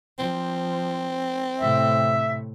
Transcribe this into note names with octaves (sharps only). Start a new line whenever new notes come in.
F3 C4
A2 C3 E5